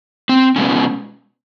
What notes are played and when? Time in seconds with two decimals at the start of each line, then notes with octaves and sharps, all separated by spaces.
0.29 C4
0.56 B2 G#3 B3 C#4